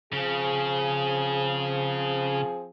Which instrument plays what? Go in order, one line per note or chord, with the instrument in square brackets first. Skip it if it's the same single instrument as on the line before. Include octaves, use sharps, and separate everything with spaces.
[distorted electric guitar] C#3 [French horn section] F3 C4 G#4